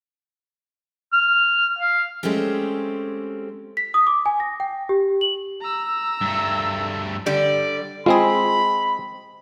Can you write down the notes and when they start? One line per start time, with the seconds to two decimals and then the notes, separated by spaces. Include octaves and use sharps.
1.13 F6
1.79 F5
2.23 G#3 A3 C4 C#4 G4
3.77 B6
3.94 D#6
4.07 D6
4.26 G#5
4.40 A#6
4.60 G5
4.89 G4
5.21 F#7
5.61 A#5 E6
6.21 G2 A3
7.26 D3 G3 D5
8.06 G#3 C4 F4 G#4 B5 A#6